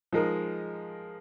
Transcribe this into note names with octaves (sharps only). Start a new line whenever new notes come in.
F3 G#3 D#4 A#4